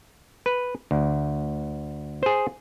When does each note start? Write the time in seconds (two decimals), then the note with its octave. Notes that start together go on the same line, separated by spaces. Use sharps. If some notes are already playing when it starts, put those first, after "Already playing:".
0.46 B4
0.91 D2
2.23 G#4 C5